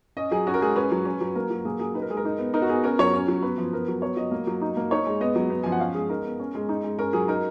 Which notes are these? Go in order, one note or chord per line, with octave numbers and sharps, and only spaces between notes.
C#4 D#5
F#3 G#4
C#4 F#4
A#4
G#3 G#4
C#4 B4
F#3
C#4
F#3
A#3 A#4
F#3
A#3 G#4
F#3 G#4
D#4 B4
A#4
G#3 G#4
A#4
D#4
B3
D#4 A#4
F#4
B3 G#4
C#4 A#4
F#3 C#5
C#4
F#3
B3 B4
F3
B3 A#4
F#3
B3 C#5
F#3 D#5
A#3
F#3
D#4
A#3
D#4 C#5
G#3
B3 D#5
F#3
B3
F3 G#5
F#5
C#4 F5
G#3 G#4
D#4 A#4
B3
C#4
G#3
D#4
G#3
C#4 A#4
F#3 G#4
D#4 A#4